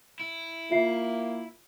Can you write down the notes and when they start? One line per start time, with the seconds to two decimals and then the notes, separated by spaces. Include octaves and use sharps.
0.20 E4
0.71 A#3 F4 E5 C7